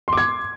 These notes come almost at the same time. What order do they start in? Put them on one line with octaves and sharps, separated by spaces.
C6 D6 G#6